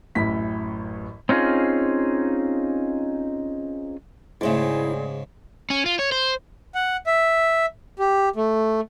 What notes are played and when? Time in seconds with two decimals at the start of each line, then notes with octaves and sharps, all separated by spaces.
0.15 A1 F#2 A2 B6
1.29 C4 C#4 D#4 F4 G#4
4.41 G#2 C#3 A3 C4 E4 G#4 D5
5.70 C#4
5.86 F4
5.99 C#5
6.12 C5
6.75 F#5
7.06 E5
7.99 G4
8.36 A3